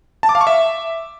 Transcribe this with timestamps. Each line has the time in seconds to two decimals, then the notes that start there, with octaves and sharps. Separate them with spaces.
0.23 A5
0.29 D6
0.35 F5
0.41 C#6
0.47 E5